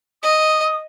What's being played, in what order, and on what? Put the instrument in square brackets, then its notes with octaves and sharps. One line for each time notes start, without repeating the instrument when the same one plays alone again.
[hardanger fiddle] D#5 [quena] D#6